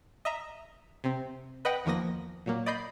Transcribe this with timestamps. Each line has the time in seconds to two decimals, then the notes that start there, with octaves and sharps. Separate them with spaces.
0.25 D#5 E5 A#5
1.04 C3 C4
1.65 B4 D#5 F#5 G5
1.85 E2 D#3 F3 A#3 D#6 A#6
2.46 A#2 F#3 A#3
2.66 D5 D#5 B5 G6 C7